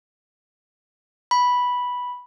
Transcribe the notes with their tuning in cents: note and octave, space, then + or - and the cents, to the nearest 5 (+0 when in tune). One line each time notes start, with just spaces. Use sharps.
B5 -5